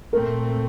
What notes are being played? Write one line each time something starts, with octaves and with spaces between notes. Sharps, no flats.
A#2 A3 C4 A#4